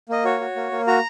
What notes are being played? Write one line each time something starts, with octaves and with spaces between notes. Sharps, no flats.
A#3 D#5
F#4 C#5
F#4
A#3
A#3
F#4 A#5